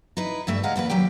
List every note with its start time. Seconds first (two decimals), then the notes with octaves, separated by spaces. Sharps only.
0.17 D#4 E4 B4
0.47 G2 G3 A3 E5
0.63 D2 G#3 D#5 F5 F#5 A#5
0.76 E2 A#3 G#4 B4
0.90 D#2 F#3 G4 G5